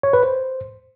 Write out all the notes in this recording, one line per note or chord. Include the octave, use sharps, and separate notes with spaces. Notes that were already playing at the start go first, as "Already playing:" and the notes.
C#5
B4
C5